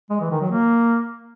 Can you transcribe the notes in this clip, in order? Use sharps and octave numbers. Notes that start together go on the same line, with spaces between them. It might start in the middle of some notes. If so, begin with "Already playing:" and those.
G#3
E3
D#3
F#3
A#3